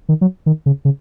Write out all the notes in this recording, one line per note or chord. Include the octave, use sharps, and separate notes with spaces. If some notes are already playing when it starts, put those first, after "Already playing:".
D#3
F#3
D#3
C#3
C#3